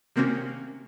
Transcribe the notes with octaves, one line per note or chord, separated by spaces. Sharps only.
C3 D#3 A#3 C4 C#4 F#4